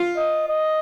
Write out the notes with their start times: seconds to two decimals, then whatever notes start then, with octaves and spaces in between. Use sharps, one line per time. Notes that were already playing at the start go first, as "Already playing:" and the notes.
Already playing: F4
0.17 D#5
0.49 D#5